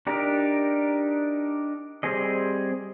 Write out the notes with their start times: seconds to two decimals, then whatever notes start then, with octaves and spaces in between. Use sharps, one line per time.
0.07 D4 D#4 G4 A#4
2.03 G3 C4 G#4 D#5